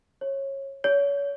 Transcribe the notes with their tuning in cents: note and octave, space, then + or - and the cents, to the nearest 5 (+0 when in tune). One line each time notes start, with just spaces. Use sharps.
C#5 -20
C#5 +30